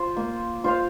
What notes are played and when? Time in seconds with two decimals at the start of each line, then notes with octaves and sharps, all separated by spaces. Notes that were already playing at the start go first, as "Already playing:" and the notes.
Already playing: F4 C5
0.17 A#3
0.64 F4 C5 F5